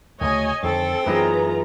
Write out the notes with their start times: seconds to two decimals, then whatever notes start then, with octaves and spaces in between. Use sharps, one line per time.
0.21 D2 C#3 A3 C#5 D#5 G#5
0.63 F2 D3 D#3 C4 A4
1.06 F#2 E3 B3 D#4 F4 G#4 A#5